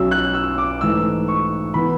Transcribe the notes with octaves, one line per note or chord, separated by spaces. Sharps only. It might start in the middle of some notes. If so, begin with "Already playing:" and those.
Already playing: B1 B2 F#3 C#4 E6
F#6
E6
D6
G#2 E3 A3 E6
C#6
E3 B3 B5